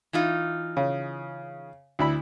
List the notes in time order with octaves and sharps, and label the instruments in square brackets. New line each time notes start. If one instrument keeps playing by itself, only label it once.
[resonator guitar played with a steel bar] E3 D#4 F4
[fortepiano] C#3
D2 E4 B5